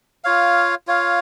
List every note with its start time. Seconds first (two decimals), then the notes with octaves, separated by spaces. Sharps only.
0.24 F4 C#5 F5
0.87 F4 C#5 F5